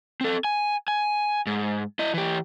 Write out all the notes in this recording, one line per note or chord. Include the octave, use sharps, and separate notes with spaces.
C4 A4
G#5
G#5
G#2
E4 D#5
E3 G4